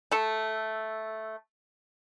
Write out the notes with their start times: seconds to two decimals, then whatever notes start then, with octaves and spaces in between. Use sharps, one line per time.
0.11 A3 A4